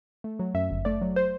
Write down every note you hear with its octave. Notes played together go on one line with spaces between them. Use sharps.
A3
F#3
F#2 E5
G1
A3 D5
F#3
C5